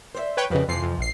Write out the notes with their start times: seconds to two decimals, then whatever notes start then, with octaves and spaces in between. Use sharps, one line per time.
0.15 C5 C#5 E5
0.37 B4 C#5 G5
0.50 F2 C#3 G4 B4 D#5
0.68 F2 C3 E3 F3 C7
0.82 F2
0.98 A#1 C7